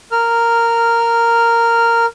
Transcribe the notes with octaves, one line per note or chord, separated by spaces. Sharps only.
A#4 F6